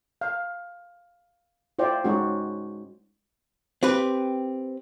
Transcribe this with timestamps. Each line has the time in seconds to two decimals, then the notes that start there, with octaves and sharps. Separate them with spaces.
0.21 F5
1.79 E4 F4 C5 D5 G5
2.04 G#3 C#4 D#4 F#4
3.83 C4 G4 B4